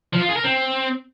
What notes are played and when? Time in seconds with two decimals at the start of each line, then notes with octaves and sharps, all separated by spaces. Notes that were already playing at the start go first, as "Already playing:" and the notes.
0.13 F3
0.21 F4
0.29 G#4
0.37 A#4
0.45 C4